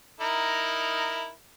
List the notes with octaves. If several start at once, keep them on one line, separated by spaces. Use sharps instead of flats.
D#4 E4 A#4